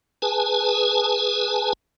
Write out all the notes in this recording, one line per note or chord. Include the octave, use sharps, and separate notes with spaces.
G#4 B4 G#5 A5